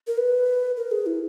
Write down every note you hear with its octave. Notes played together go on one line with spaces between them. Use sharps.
A#4
B4
A#4
G#4
E4